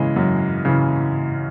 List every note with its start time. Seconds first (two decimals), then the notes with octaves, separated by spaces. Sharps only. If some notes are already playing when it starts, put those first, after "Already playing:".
Already playing: C#3 E3 G#3
0.16 F#2
0.65 C#3 E3